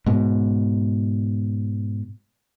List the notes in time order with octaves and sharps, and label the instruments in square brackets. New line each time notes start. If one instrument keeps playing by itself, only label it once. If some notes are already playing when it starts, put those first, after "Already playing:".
[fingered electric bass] G#2 B2